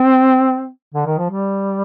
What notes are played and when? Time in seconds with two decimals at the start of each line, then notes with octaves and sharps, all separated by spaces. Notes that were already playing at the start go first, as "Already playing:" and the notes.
Already playing: C4
0.94 D3
1.06 D#3
1.18 F3
1.29 G3